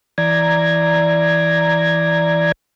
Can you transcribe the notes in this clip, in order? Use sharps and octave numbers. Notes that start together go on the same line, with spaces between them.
E3 D5 A#5 G#6